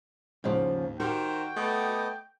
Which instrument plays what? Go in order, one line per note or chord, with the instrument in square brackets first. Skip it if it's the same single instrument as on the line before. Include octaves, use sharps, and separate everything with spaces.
[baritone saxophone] D#2 [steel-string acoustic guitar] G#2 C#3 F3
[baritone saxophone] D#3 [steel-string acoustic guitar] F#4 G4 [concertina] C5 [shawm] G5
[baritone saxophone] A3 [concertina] B3 D#5 D6